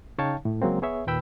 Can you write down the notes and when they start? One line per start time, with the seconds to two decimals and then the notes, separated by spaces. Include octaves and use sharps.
0.18 C#3 D#4 C#5 F5 G5 A5
0.45 A2
0.62 C#3 F#3 G#3 A#3 C4
0.82 B3 G#4 C#5 E5
1.07 D#2 A#2 B4 G5 B5 E6